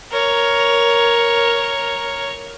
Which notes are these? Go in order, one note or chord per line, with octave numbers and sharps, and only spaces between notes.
A#4 C#5